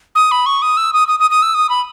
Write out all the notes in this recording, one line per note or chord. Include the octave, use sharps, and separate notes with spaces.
D#6
B5
C#6
D#6
E6
D#6
D#6
D#6
D#6
E6
D#6
B5